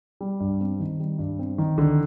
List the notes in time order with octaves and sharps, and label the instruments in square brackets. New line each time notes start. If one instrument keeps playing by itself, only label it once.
[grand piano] G3
G2
C4
D#3
G3
G2
C4
D#3
D3